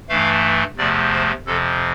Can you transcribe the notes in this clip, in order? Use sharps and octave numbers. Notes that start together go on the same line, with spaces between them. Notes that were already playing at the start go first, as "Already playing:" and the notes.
G2 E3 A3 F5
E2 C3 F3 A3 D5
C5
F2 C3 F3 A4